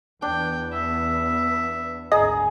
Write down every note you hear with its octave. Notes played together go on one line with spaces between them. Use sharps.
E2 B3 D4 G5
E5
G#1 D2 G#4 D#5 A#5